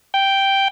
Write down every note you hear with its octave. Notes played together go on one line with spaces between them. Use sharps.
G5